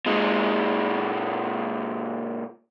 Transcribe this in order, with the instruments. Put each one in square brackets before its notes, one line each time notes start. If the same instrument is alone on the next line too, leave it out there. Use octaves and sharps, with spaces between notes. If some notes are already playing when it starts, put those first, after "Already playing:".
[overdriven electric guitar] A#2 G#3